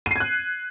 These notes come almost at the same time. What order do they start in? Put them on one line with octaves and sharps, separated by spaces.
D#7 C7 G#6 F#6